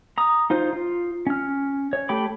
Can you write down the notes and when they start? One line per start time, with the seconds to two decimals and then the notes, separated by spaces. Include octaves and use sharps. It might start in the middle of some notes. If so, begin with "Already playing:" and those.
0.18 A#5 D#6
0.50 D#4 F4 C5
0.73 F4
1.27 C#4 F6
1.93 C#5
2.09 A3 G4 G5 B5 D6